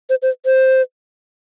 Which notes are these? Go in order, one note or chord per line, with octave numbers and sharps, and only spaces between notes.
C5
C5
C5